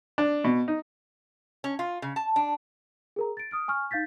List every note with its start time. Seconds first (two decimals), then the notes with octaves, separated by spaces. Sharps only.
0.18 D4
0.44 B2
0.68 D#4
1.64 C#4
1.79 F4
2.02 C#3
2.16 A5
2.36 D4
3.16 G#4 A#4 A#5
3.37 A6 D7
3.51 D#6 F6 D7
3.68 G#5 C#6 F6
3.91 D#4 F5 G6 A6 B6